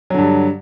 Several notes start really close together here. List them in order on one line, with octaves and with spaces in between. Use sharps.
F#3 D3 G2